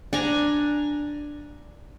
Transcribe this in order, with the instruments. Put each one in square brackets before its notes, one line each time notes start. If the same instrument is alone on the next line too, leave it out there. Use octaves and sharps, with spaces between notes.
[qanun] D4 G#5 A#5